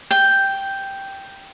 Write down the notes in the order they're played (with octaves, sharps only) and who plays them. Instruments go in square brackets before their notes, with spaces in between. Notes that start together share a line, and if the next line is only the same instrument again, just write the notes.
[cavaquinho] G5